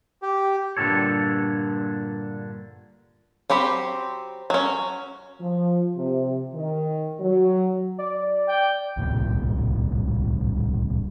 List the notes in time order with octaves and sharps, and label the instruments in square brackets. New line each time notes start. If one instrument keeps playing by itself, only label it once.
[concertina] G4
[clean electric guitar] G2 A#2 D3 F3 A4 C#5
[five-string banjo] F#3 C4 G4 B5
F#3 C#4
[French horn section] F3
C3
D#3
F#3
[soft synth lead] D5
[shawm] G5
[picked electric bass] D1 C2 G2 A#2